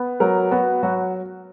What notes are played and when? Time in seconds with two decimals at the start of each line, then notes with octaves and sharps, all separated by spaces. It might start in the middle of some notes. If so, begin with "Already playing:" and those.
Already playing: B3
0.20 F#3 A#4
0.51 B3 F#4
0.83 F#3 F#4